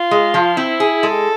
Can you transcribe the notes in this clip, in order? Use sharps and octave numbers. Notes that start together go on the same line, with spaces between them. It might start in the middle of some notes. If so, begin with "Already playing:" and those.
Already playing: F4
G#3
F3
C4 E4
G#4
G#3 A4